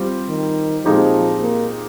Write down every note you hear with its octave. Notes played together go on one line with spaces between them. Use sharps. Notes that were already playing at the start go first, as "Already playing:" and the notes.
Already playing: G3 C4 F4
D#3
A#2 F3 G#3 C4 D#4 G4
A#3